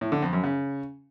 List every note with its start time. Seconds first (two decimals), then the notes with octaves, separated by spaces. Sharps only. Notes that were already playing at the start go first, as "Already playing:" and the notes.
0.01 A2
0.12 D3
0.22 F2
0.33 F#2
0.44 C#3